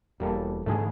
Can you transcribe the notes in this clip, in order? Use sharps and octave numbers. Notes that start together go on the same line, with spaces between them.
E1 G3 A#3 A4
G#2 D3 E3 A3 G#4